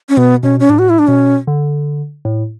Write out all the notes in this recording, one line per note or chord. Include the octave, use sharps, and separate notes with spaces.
C#4
B2 B3
B2 C#4
C#4
A2 D4
F#4
E4
D4
B2 C#4
D3
A2